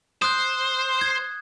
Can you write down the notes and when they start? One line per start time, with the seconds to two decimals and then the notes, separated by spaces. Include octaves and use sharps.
0.22 C5 D#6 F#6
1.01 G#6